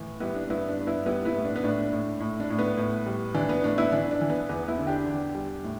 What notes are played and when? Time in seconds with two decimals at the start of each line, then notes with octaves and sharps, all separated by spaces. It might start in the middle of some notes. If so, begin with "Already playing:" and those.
Already playing: A2 E3
0.20 G3 B3 E4
0.35 D4
0.50 G2 B3 E4
0.69 D4
0.78 G2
0.87 B3 E4
1.06 G3 B3 E4
1.25 B3 E4
1.35 A2
1.44 D4
1.56 B3
1.63 A2 D4
1.92 A2
2.20 A2
2.40 D4
2.50 A2
2.59 B3
2.77 A2
3.06 G3
3.34 E3 D4
3.49 B3
3.64 A2 D4
3.78 B3 E4
3.92 E3 D4
4.11 D4
4.21 E3
4.30 B3
4.49 E2 B3
4.68 B3 E4
4.78 D3
4.87 D4 G4
5.06 E2
5.35 G3
5.64 A2